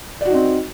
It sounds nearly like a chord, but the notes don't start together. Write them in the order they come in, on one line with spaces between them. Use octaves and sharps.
D5 F#4 D#4 C4